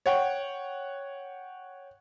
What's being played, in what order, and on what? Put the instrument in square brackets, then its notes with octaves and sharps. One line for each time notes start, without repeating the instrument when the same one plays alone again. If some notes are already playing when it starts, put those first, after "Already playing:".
[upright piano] C#5 F#5 G5